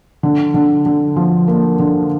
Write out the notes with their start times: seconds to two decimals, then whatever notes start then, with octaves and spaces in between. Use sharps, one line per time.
0.23 D3
0.54 D3
0.86 D3
1.16 F3
1.48 A#3
1.79 D3